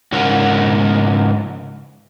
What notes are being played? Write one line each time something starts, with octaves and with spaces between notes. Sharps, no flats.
G#2 C#3 F#4 A#4